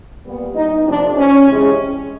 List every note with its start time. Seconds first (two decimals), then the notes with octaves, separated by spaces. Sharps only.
0.25 A#2 G3 B3
0.56 D#4
0.86 C3 F3 A3 C4 D4
1.16 C#4
1.47 C3 E3 G#3